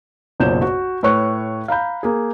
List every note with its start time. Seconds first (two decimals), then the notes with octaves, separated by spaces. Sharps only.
0.40 F#1 B1 A#2 C5 G6 E7
0.62 F#4
1.03 A2 B4 C#5 C#6 F#6
1.68 F5 A#5 B5 G6
2.03 A#3 G#4